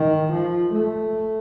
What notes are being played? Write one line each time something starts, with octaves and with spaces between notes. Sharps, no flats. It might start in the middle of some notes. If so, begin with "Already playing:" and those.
Already playing: D#3
F3
A3